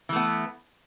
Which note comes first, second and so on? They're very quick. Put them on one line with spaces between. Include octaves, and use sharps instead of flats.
E3 A3 B3